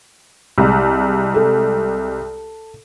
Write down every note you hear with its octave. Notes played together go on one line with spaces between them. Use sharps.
C2 G#3
A4